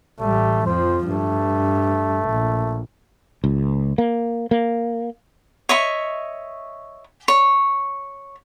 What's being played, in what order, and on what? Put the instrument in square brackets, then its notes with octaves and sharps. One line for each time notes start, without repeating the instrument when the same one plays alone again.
[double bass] A1 G3 [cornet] A3
[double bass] F2 F3 [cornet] C5
[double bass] G2 [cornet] A3
[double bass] A#1
[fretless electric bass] C#2
A#3
A#3
[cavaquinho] C#5 D#5 E5 C#6
C#5